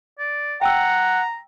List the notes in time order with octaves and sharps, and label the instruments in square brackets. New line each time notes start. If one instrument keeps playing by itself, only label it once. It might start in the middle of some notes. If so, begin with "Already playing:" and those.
[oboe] D5
[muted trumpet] F#5 [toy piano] G5 E6 [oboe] A#5